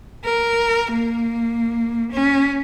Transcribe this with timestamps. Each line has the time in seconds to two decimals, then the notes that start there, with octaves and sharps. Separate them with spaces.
0.25 A#4
0.93 A#3
2.12 C#4